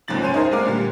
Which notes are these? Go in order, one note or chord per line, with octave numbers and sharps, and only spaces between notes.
G1 G#2 C#3 F3 A6 F#7
C#2 F#2 C#4 C6 D#7
D#4 E4 G#4 A#4 C5
G#3 C4 A#4 D5 F5
A#2 D3 G3